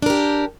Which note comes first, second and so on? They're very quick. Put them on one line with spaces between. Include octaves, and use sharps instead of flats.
D4 A#4 G4